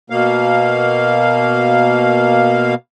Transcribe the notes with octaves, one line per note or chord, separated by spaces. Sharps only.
B2 A#3 F5